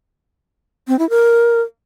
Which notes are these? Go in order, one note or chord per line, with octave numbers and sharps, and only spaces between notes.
C4
E4
A#4